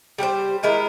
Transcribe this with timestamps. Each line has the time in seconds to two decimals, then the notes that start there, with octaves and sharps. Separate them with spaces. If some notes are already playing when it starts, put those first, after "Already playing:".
0.18 G3 G4 A#4 C5
0.63 D#3 G#3 E4 A#4